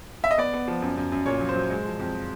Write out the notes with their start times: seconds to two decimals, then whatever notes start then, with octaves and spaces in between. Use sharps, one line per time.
0.24 E5
0.31 D#5
0.38 B3 D5
0.54 B3
0.68 F3
0.82 F#2
0.98 F#2
1.12 F#2
1.26 A#2 C#5
1.41 F#3
1.49 C5
1.56 F#3
1.70 G#3
1.86 F3
1.99 F2